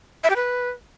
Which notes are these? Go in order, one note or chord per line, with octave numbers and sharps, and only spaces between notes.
E5
G4
B4